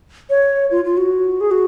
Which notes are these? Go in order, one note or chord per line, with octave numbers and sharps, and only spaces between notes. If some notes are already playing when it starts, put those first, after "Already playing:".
C#5
F4
F4
F#4
G#4
F#4